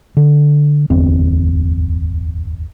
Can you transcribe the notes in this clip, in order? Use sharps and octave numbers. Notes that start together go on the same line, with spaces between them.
D3
D1 G1 E2 C4